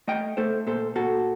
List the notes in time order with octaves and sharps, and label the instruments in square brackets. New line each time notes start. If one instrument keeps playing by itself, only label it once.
[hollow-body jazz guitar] A3 D#5 G5
A3 A4 C5
A#2 A4 C5
A#2 F#4 A4